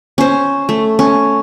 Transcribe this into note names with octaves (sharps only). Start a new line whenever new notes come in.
C#4 C5
A3
C#4